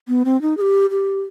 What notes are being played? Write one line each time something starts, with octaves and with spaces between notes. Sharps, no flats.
B3
C4
D#4
G#4
G4
G4